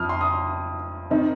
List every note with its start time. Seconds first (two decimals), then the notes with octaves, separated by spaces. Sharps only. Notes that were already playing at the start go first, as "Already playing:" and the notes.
Already playing: F2 F3 D#6 F6
0.09 C6
0.21 D#6
1.10 D#3 C4 D#4